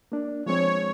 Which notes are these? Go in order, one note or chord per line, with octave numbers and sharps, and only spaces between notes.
A#3 D4
F3 G#3 C4 C#5